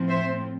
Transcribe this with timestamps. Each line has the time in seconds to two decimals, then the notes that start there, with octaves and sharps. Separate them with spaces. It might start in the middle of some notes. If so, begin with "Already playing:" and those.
Already playing: A2 F3 C4
0.08 C5 E5